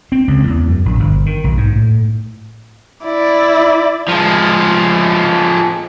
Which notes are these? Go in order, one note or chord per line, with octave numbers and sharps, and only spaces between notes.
C4
C#2
E2
F#2
A#1
G1
D#3
B1
G#2
A2
E4 D5
F3 G#3